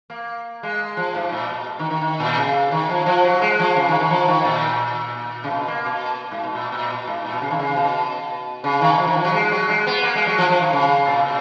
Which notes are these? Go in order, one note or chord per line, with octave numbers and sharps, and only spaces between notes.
A#3
G#3
F3
G#2
A#2
B2
D#3
D#3
D#3
A#2
C#3
D#3
F3
F3
F#3
G#3
F3
C#3
D#3
D#3
F3
D#3
A#2
C#3
B2
A#3
B2
G#2
B2
A#2
A#2
B2
G#2
A#2
B2
C#3
D#3
C#3
B2
C#3
D#3
F3
D#3
F3
F#3
G#3
F#3
G#3
B3
A#3
G#3
F#3
F3
F3
D#3
C#3
A#2
A#2